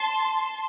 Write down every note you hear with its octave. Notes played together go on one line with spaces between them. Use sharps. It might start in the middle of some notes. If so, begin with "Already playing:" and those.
Already playing: A5 C6